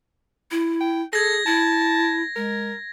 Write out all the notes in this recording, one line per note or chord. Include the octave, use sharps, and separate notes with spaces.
E4
G5
G#4 A4 G#6 A#6
E4 A5
G#3 A#4